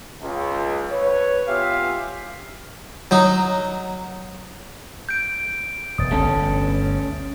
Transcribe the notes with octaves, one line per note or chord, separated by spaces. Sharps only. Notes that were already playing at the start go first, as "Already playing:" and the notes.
C#2
B4 C#5
B3 F4 G4 E5 F5 G#5
F#3 D#4
G6 D7
E1 D#6 A6
G1 D2 A3 C#4 A4